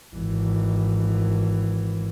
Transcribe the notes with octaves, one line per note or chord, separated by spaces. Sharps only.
G#1 E3